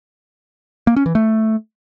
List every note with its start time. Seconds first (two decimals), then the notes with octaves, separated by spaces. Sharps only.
0.87 A#3
0.96 C#4
1.06 E3
1.15 A3